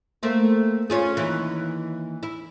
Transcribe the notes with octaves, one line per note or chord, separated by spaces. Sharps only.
A3 A#3 C4
C#4 F4 G#4
D#2 E3
E4